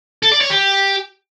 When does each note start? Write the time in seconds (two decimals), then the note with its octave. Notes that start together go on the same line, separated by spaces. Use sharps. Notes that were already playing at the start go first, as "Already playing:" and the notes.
0.23 A4
0.32 D5
0.41 C#5
0.50 G4